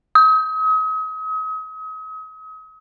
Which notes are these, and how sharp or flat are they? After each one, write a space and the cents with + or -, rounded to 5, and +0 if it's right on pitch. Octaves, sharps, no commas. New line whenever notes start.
D#6 +40